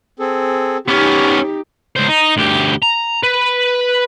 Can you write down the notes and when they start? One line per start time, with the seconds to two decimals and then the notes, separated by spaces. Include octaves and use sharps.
0.20 C4 G#4 A4
0.88 B3 C#4 D#4 G4 D6 F6
1.96 C#2 C5
2.08 D#4
2.37 D2 G4
2.82 A#5
3.23 B4